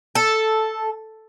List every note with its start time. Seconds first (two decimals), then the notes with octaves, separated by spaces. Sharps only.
0.15 A4